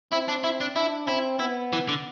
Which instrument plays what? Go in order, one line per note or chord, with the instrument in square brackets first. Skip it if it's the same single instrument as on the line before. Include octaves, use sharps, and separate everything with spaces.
[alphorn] C4 [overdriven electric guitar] E4
[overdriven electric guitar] D4
E4
D4
[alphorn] D4 [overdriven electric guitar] E4
[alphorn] C4 [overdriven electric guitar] E4
[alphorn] B3 [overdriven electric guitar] E4
[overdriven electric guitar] E3
D3